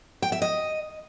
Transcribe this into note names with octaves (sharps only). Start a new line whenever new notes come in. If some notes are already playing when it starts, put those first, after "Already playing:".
G5
E5
D#5